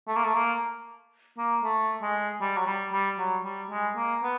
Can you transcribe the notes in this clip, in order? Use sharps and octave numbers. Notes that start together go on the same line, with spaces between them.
A3
A#3
A3
A#3
A#3
A3
G#3
G3
F#3
G3
G3
F#3
G3
G#3
A#3
B3